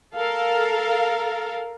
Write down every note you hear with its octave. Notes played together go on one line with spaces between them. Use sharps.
A4 A#4 F5